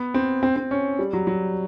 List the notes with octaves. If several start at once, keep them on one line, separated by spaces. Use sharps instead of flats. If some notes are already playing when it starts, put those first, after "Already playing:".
Already playing: B3
C4
C4
C4
C#4
G3
F#3
F#3